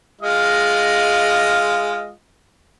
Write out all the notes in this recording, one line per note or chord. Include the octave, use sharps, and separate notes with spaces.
G#3 F4 D#5